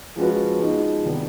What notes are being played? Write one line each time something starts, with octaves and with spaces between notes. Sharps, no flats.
F3 G#3 C#4 F#4 B4
F3 G#3 B3 D#4
C3 D#3 G3 B3